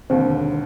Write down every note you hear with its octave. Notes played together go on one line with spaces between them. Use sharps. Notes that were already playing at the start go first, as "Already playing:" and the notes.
E1 D#2 D3 C4 C5